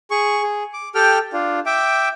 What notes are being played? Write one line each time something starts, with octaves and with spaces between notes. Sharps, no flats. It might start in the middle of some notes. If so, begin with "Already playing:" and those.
G#4 C#6
G#4
D6
G4 A4 G5 F6
D4 F4
E5 G5 D6